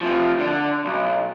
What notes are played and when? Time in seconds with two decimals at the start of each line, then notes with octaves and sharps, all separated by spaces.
0.01 C3 F3
0.39 D3
0.85 B1